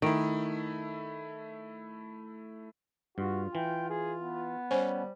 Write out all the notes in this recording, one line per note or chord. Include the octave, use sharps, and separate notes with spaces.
D#3 A3 E4
G2 F4 F#4
E3 G5
F4 G#4
B3
G3 C#4 C5 G#5